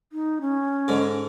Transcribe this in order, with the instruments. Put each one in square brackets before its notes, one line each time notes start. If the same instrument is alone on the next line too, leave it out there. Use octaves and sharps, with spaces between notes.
[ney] D#4
C#4
[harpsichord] G#2 D3